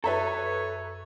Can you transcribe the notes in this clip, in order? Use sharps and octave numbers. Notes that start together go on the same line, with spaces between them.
F#2 A4 B4 C#5 E5 A#5